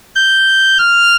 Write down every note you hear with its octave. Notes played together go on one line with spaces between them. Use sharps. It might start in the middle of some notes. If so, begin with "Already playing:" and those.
G6
F6